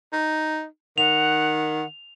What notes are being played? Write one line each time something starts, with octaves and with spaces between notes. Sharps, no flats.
D#4
D#3 F#5 F7